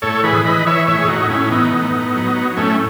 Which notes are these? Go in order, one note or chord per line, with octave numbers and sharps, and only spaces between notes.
A2 A4 C#5
E3 G#4 B4
E3 B4 D#5
E3 C#5 E5
A2 C#5 E5
G#4
A2 D#4 F#4
A2 C#4 E4
E3 B3 D#4
A2
A2
F#3
F#3
A2 A3 C#4